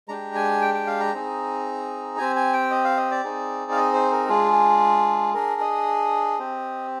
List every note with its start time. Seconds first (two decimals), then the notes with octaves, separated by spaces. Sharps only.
0.08 G#3 D4 G4 A#5
0.35 G#5
0.62 G5
0.74 G5
0.87 F5
1.00 A#5
1.14 C4 D#4 G#4
2.18 C4 G4 G#5
2.36 G#5
2.53 G5
2.71 D#5
2.84 F5
2.97 D#5
3.11 D5
3.24 C4 D#4 G#4
3.71 F5
3.77 D#5
3.93 C5
4.12 A#4
4.28 G#3 D4 F4 G#4
4.52 G#4
5.34 D4 G#4 A#4
5.61 D#5
6.39 C4 G4